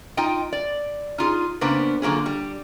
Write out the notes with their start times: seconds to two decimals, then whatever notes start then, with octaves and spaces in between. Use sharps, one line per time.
0.17 D#4 F4 D#5 G5
0.53 D5
1.18 D#4 F4 G#4
1.61 C#3 A#3 B3 D4 C5
2.02 D3 F#3 A#3 F4 G#4
2.26 G3